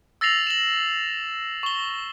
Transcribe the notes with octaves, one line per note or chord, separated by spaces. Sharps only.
E6 A6 A#6 C7 F7 F#7
E7 F#7
C#6 G7